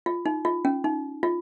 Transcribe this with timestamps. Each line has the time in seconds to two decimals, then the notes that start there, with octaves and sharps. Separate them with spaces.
0.06 F4
0.26 D#4
0.45 F4
0.65 C#4
0.84 D#4
1.23 F4